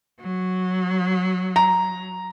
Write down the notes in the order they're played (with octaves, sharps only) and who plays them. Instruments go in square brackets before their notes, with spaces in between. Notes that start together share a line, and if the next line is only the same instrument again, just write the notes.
[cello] F#3
[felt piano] A#5